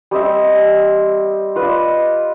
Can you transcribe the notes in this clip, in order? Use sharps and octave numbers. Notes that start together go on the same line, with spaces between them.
G3 C4 D#5 E5
F4 B4 D5 D#5